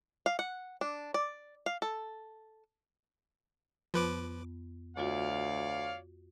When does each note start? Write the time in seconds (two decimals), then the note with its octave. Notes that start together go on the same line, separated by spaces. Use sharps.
0.26 F5
0.39 F#5
0.81 D4
1.14 D5
1.66 F5
1.82 A4
3.94 F2 F3 B3 B4 D6
4.97 D2 F4 F#4 C#5 D5 F5